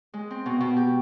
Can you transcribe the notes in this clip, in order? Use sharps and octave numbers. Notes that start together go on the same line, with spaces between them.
G#3
C4
B2
B2
G4